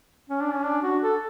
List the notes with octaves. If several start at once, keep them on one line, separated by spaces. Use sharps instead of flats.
C#4
D4
C#4
D4
F#4
A4